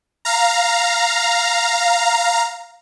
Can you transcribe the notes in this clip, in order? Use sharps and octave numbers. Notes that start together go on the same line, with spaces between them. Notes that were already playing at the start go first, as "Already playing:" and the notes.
F5 A#5